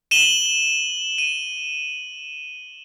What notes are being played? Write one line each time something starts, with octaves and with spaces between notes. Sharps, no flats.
D#7 E7 F#7 G7
D#7